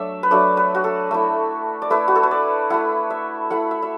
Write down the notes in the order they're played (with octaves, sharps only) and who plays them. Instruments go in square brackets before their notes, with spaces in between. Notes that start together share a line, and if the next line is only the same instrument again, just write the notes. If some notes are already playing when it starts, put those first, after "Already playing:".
Already playing: [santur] F#3 A3 D4 D5 E5
B4
F#3 A3 D4 D5
B4
F#4
A4
A3 E4
D5
A3 E4 B4
F#4
A4
B4
D5
A3 E4 F#5
E5
A3 E4 F#5
E5
E5